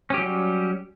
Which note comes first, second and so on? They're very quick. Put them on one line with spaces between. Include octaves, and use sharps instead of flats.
C#4 G4 F#3 G3